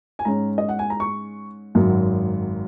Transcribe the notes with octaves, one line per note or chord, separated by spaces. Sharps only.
G#5
G#2 G#3 C#4 A#5
D#5
F#5
G#5
A#5
C#6
G#1 F#2 F#3